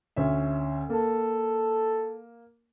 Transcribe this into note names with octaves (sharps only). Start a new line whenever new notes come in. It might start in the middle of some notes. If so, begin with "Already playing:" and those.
D2 C#4 E5
A#3 A4